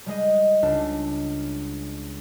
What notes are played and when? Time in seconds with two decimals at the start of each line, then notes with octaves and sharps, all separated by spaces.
0.06 G3 G#3 D#5
0.63 C#2 D4